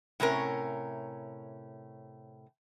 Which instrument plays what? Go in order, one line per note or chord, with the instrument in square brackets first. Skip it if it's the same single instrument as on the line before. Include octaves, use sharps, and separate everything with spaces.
[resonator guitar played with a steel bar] A2 C3 C#4 A#4